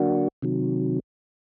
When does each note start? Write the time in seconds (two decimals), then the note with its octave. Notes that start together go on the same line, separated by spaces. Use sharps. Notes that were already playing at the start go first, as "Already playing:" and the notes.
Already playing: D3 F#3 A#3 D4 F#4
0.42 C3 D#3 F#3